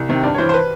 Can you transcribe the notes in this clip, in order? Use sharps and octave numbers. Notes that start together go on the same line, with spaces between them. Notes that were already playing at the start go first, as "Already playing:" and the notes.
Already playing: C2
C3 D#3
G2 D5
C#5
E3 C5
C5
B4